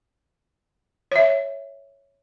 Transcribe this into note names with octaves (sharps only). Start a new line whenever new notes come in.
C#5 E5